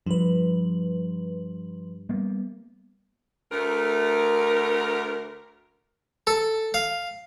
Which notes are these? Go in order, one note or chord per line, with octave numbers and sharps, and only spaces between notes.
G2 F3 B4
G3 A#3 B3
D2 A3 A#4
A4
F5